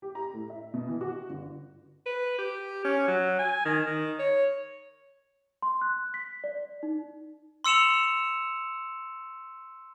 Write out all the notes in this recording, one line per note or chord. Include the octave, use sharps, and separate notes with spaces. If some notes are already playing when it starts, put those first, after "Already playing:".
G4
A#5
A2
E5
B2
E3
F#4
G1
B4
G4
C#4
F#3
G#5
D#3
D#3
C#5
C6
F#6
B6
D5
D#4
C6 E6 C#7 E7 F7